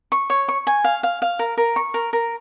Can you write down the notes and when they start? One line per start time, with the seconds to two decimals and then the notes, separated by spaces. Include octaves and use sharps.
0.12 C#6
0.30 C#5
0.48 C#6
0.67 G#5
0.84 F5
1.03 F5
1.22 F5
1.39 A#4
1.57 A#4
1.76 C#6
1.94 A#4
2.13 A#4